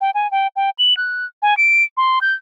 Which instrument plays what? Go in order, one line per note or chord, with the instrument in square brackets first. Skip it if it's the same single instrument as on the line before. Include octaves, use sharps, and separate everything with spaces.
[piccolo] G5
G#5
G5
G5
F#7
F#6
G#5
D7
C6
G6